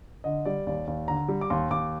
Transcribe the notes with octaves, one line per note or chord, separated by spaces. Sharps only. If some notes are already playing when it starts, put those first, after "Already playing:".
D3 D#5
G3 D5
D#2 D5
D#2
D3 A#5
G3
D6
D#2 C6
D#2 D6